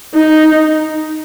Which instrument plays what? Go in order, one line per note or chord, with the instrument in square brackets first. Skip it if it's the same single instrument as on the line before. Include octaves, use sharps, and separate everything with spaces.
[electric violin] D#4